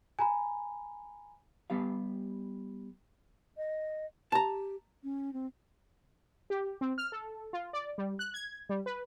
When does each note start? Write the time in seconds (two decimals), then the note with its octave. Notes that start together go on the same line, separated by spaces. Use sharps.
0.19 G#5 A#5 B5
1.70 G3 B3 G4 F5
3.57 D#5
4.32 G4 A5 A#5
5.04 C#4
5.33 C4
6.50 G4
6.81 C4
6.98 F6
7.12 A4
7.53 F4
7.73 D5
7.98 G3
8.19 F#6
8.34 G#6
8.69 G3
8.86 B4